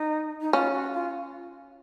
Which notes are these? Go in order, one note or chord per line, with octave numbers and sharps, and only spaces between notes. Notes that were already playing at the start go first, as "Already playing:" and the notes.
Already playing: D#4
D#4
C#4 F4
F#4
F4